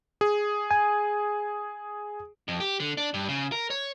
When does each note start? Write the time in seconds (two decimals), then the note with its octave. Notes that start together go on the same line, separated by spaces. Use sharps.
0.21 G#4
0.71 G#5
2.48 F2
2.60 G4
2.80 D3
2.97 D4
3.14 G2
3.29 C#3
3.52 A#4
3.70 C#5